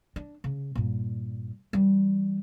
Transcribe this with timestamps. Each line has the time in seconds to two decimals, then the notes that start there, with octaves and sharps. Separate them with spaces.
0.16 D4
0.44 C#3
0.75 G2 A#2
1.73 E3 G3